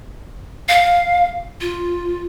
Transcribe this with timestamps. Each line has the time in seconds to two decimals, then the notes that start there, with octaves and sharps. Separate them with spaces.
0.69 F5
1.61 F4